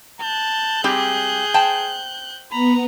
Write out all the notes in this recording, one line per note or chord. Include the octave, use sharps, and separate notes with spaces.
A5 F#6 G6
G3 C4 G4 G#4
C5 G5 A5
B3 A#5 B5